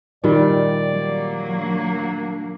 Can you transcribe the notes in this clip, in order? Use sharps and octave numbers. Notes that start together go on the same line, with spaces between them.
A#2 D#3 G3 D5
F#3 A#3
D4